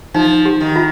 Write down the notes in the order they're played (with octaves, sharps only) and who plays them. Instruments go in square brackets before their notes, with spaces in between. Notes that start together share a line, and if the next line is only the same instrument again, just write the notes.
[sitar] F3 [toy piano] D#4
[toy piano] G4
[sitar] D#3
[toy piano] F4